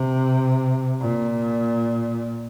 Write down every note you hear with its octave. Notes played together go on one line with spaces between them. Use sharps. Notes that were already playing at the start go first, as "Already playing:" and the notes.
Already playing: C3
A#2